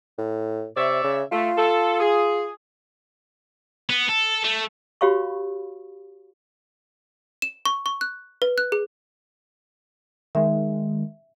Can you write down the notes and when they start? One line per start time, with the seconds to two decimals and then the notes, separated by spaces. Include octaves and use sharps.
0.18 A2
0.76 C3 C#5 D5 E5
1.04 C#3
1.32 A3 F4
1.57 A4
2.00 G#4
3.90 B3
4.09 A4
4.44 A3
5.01 F#4 G4 C#5 F5 B5 C#6
7.42 E7
7.65 C#6
7.86 C#6
8.01 F#6
8.42 B4
8.58 F#6
8.72 G#4
10.35 D#3 G#3 E5